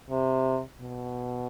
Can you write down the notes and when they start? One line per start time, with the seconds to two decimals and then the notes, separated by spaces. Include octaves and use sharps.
0.10 C3
0.81 B2